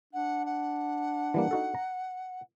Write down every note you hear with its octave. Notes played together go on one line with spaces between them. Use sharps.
D4 F#5
F#5
E3 G3 A#3
D#4 F#4 A4
A#5